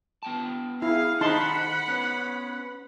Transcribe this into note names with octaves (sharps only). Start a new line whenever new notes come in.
B3 G5 A5
E4 G#4 F5
D#3 D#4 A4 C5 F#5 A5 B5 C6
B3 C#4